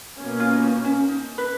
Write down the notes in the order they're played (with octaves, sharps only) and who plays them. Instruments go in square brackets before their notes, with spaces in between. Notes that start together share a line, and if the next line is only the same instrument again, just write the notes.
[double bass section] B2 A#3 C#4
[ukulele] F4
D#4
C#4
D#4
B4